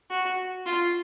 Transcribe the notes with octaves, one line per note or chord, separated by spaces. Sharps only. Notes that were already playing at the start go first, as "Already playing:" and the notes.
F#4
F4